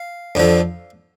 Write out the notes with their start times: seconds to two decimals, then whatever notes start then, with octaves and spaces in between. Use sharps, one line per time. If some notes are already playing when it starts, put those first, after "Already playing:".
Already playing: F5
0.35 F2 D3 F3